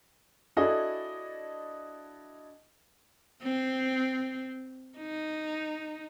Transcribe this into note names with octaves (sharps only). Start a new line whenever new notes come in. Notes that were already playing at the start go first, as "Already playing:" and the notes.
D4 E4 F#4 G#4 A4 D#5
C4
D#4